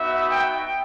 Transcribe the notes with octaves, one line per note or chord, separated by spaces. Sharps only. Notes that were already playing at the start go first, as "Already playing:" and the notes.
Already playing: B3 D#4 F#4 E5
G5